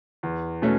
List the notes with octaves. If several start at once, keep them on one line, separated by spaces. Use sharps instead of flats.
E2
B2 A3 C#4